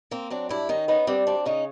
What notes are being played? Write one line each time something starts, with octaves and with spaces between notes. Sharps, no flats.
A#3 C4
F#3 C4 D4
G2 D4 E4
D#3 C#4 D#4
B3 C#4 D#4
G3 C4 D4
D2 C4 D4
C#3 C#4 D#4